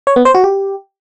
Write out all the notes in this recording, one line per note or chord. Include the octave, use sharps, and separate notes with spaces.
C#5
B3
C5
F#4
G4